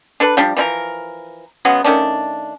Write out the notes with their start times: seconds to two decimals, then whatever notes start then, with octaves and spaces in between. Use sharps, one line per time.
0.20 D4 A4 B4
0.37 F3 G3 D4
0.57 E3 F3 E4 A#4
1.65 C#3 F#3 G#3 B3
1.84 D#3 A3 C#4 D4